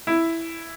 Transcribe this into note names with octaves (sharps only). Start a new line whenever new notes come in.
E4